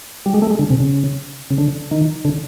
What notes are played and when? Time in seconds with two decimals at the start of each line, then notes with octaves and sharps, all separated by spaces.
0.26 G3
0.34 G#3
0.42 A3
0.50 G#3
0.59 D3
0.70 C3
0.80 C#3
1.50 C#3
1.58 D3
1.91 D#3
2.25 D3